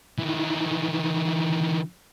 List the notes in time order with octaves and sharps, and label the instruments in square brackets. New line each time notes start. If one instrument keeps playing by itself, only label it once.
[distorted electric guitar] D#3 E3